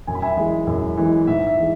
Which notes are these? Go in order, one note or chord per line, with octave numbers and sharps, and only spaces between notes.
F#2 G#5
B5
E5 G#5
E3 G#3
F#2
E3 G#3
G#2 E5
E5
E3 G#3